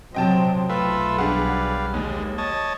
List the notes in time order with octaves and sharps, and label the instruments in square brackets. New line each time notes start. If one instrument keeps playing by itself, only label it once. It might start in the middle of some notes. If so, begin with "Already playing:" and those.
[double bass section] C3 F#3 C4 [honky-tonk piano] D#5 G5 A5
[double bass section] B1 [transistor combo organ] A3 F4 E5 [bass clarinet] B4
[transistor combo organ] G3 F5 [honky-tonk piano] D4 G#4 F#5
[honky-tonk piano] D#2 [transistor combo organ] G#3
[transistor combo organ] C#5 D#5 A5